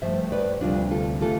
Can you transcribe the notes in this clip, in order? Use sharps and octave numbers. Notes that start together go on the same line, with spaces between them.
G2 F3 A3 C5 E5
B4 D5
D2 C3 G3 D4 F4
F4 A4
E3 A3 F4 A4